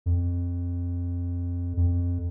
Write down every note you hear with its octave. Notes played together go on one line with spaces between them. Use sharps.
F2
F2